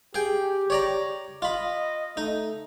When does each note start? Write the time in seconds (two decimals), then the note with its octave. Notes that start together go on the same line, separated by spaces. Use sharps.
0.15 G4 G#4 G5
0.70 C#5 D5 A#5
1.42 F4 D#5 B5
2.17 A3 D#4